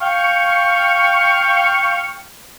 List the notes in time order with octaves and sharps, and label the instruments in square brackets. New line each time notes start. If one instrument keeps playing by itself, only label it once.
[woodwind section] F5 G5 C#6